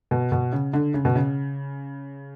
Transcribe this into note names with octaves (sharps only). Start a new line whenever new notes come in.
B2
B2
C#3
D3
C#3
B2
C#3